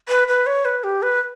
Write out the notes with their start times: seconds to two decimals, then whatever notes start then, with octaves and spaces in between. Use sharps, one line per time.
0.09 B4
0.28 B4
0.46 C#5
0.65 B4
0.84 G4
1.02 B4